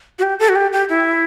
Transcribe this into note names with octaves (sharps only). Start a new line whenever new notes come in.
F#4
G4
A4
F#4
G4
G4
E4